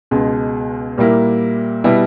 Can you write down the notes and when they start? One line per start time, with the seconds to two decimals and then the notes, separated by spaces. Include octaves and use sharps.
0.11 C#2 B2 G#3
0.98 A#2 G3 A#3 E4
1.84 B2 G3 B3 E4